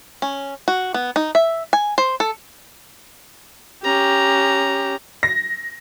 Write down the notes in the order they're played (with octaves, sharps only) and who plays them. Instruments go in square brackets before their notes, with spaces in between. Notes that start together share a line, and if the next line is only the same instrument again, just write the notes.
[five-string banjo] C#4
F#4
B3
D#4
E5
G#5
C5
A4
[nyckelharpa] C#4 A#5 [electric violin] G4
[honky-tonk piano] A#6